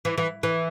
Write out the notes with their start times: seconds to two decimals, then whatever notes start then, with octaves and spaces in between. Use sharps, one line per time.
0.05 E3
0.18 E3
0.43 E3